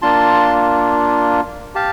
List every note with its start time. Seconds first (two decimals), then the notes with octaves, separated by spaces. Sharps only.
0.02 A#3 D4 F4 A5 C6
1.75 G4 F5 A5